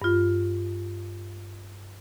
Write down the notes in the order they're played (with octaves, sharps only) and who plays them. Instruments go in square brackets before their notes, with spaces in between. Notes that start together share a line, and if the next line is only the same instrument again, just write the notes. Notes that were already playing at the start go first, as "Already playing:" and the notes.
[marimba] G2 F4